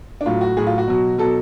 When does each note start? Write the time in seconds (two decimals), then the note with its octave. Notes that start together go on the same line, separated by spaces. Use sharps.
0.21 D4
0.26 A2 F#3 F4
0.41 F#4
0.57 A2 F#3 G#4
0.67 F4
0.78 F#4
0.88 B2 F#3
1.18 B2 F#3 A4